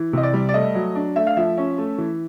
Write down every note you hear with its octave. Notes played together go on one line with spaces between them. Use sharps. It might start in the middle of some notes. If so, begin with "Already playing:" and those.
Already playing: E3
C3 D#5
D5
G3
D5
A3 D#5
F#3
D4
A3 E5
F5
F3 E5
C#4
A3
E3